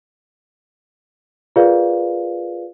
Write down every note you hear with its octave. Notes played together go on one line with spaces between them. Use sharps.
F4 G#4 A#4 B4 D5 F5